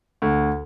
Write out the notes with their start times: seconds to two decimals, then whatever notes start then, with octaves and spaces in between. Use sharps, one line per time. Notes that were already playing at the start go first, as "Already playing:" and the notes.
0.22 D2